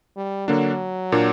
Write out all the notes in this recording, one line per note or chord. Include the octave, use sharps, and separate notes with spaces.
G3
D3 F#3 A#3 D4
A#2 A#3 D4